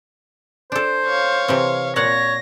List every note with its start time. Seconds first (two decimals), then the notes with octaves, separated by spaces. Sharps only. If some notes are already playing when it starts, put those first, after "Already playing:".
0.72 D4 A4 C5
1.06 C#5 F5
1.48 C3 E3 C4
1.96 A#2 C#5 F5 F#5 A#6